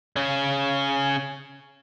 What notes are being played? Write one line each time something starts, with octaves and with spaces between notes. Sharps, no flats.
C#3 C#4